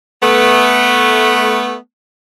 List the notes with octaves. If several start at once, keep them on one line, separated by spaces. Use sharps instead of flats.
A3 B3